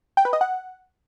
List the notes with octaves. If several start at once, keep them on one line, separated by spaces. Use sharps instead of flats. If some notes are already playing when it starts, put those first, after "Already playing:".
G5
B4
D#5
F#5